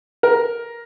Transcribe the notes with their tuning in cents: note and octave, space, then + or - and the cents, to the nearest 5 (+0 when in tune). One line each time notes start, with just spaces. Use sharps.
A#4 +10